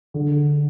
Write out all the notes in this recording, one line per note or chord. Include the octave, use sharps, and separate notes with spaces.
D3